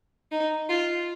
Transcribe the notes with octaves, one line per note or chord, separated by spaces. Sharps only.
D#4
F4